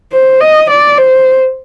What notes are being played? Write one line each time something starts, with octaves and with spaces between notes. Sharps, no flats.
C5
D#5
D5
C5